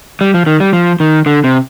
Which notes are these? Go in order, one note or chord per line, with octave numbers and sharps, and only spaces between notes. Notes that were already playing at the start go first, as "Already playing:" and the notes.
G3
F3
D#3
G3
F3
D#3
D3
C3